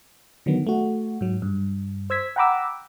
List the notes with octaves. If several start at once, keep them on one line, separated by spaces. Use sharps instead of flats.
D3 D#3 F#3 B3
A3 F#4
G#2 F#3
G2
C5 E6 G#6 B6
F#5 G5 A#5 B5 D6 E6